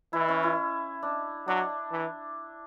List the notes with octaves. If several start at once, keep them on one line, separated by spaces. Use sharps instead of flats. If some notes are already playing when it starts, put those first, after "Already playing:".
E3 E4
C#4
E4
D4
F#3 D4
E3